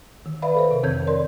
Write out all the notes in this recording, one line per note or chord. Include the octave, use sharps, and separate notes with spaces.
D#3
B4 D5 E5 F5 B5
A4 B4 C5
C3 A#4
F2 D#3 C4 C#5 G6 G#6
A#4 D5 C6